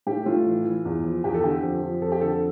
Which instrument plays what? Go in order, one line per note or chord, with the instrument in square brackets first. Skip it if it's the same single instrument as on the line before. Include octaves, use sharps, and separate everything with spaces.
[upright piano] A2 G4
A2 F4
E3
E3
E2
F3
E2 G4
A4
D3 G4
F2
F3
F2 A4
G4
D3 A4